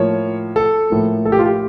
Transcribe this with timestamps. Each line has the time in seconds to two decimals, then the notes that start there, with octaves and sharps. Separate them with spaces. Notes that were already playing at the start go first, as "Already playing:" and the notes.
Already playing: A2 F3 A#3 C#5
0.56 A4
0.90 A2 F3 A#3
1.25 A4
1.32 G4
1.39 F4
1.46 G4